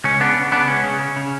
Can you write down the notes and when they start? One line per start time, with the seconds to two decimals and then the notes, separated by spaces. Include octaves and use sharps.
0.04 C#2 C#4
0.20 C#3 B3 D4
0.37 C#3
0.52 C#3 B3 D4
0.68 C#2 C#4
0.84 C#3
1.00 C#3
1.16 C#3